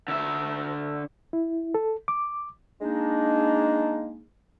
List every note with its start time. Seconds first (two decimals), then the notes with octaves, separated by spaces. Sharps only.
0.08 D3 E5
1.33 E4
1.74 A4
2.08 D6
2.81 G#3 A#3 D4 D#4